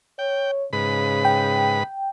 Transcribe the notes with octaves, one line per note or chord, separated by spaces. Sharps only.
C#5 G5
G#2 C#3 B4 B5
G5